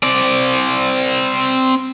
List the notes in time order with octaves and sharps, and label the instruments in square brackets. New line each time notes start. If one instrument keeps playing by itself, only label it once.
[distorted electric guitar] C4 D5